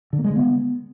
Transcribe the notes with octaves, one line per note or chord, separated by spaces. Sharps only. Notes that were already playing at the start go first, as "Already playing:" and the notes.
D3
A#3
G#3
D3
B3